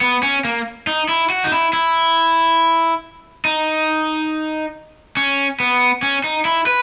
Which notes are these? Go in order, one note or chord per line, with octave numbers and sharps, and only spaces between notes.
B3
C#4
A#3
D#4
E4
F#4
D#4
E4
E4
D#4
C#4
B3
C#4
D#4
E4
B4